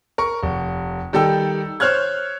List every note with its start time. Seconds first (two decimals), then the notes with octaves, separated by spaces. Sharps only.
0.18 A#4 C#6
0.43 F1
1.13 D#3 G3 A4 G5 E6
1.80 C5 C#5 F6 F#6 G#6